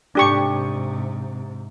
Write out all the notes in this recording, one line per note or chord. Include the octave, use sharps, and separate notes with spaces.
G#2 C3 D4 G4 C#6